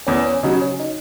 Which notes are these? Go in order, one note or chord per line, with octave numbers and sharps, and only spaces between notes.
E2 C#4
C#4
C#3 F#3 D#4
C#4
D#4